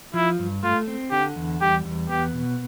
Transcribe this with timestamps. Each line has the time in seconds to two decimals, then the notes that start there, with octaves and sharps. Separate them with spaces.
0.14 F3 E4
0.39 G2
0.63 A3 F4
0.88 C4
1.11 D3 G4
1.36 E2
1.61 G3 G4
1.85 E2
2.09 B3 G4
2.33 B2